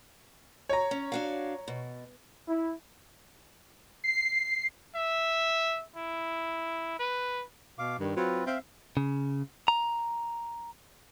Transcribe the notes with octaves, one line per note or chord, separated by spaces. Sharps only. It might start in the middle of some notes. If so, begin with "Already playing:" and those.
C#5 A#5
C#4
D4 F#4 F5
B2
E4
C7
E5
E4
B4
B2 F5 D6
G2 D#3 G3
F#3 C4 F4 B4
C4 E5 F5
C#3
A#5